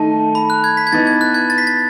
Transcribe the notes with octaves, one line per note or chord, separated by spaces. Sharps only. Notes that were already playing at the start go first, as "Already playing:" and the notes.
Already playing: D#3 A3 D#4 A5
B5
F#6
G#6
B6
G#6
E3 B3 D#4 A6
G#6
F#6
G#6
A6
B6
A6